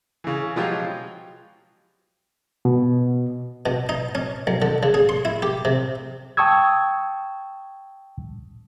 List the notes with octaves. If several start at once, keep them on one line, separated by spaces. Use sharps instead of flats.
C#3 E3
B2 F3 F#3 G#3 F4 G4
B2
B2
D#4
C#4
B1
D3
C#3
G#4
C6
E4
G4
C3
G5 A5 C#6 D#6 E6 G#6